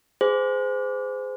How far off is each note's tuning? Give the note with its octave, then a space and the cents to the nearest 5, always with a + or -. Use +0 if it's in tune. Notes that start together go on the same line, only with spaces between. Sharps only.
G#4 +0 C5 -30